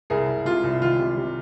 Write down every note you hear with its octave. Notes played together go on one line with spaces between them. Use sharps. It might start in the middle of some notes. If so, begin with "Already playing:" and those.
C2 G#4 A#4
C2
C3 F4
C2
D#3 F4
C3
C3